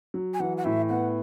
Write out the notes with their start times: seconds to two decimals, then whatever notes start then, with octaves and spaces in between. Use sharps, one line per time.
0.14 F#3
0.34 G#5
0.40 E3 F#5
0.57 F#5
0.64 A2 E5
0.89 B3 F#5